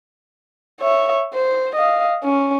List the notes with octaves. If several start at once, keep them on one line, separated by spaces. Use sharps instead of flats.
C#5 E5
C5
D#5 F5
C#4